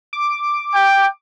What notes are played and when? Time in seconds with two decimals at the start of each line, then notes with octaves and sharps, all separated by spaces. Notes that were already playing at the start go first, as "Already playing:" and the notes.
0.13 D6
0.75 G5